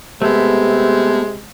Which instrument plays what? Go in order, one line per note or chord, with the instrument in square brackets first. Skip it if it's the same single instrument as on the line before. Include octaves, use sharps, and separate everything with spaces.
[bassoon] C3 [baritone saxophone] G#3 [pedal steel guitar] A3 B3